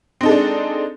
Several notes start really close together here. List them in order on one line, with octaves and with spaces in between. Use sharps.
C4 D#4 A4 G#3 D4